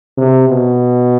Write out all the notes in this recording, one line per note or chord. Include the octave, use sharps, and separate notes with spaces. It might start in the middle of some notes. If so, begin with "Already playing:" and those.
C3
B2